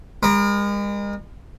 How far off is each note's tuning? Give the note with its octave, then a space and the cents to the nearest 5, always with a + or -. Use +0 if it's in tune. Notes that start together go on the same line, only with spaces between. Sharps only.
G#3 -40 A#4 +25